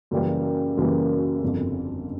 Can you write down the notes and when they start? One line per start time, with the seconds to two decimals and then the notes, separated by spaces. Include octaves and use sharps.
0.11 F#2 C#3 E3 G3 A#3
0.77 F#2 C#3 E3 G3 A#3
1.42 G1 F2 C#3